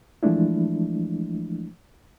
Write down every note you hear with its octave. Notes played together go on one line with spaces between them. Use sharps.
E3 F3 G#3 A3 D4 E4